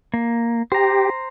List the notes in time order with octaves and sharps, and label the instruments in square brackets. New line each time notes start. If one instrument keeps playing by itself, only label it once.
[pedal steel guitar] A#3
[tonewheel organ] G4 [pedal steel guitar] C5 A#5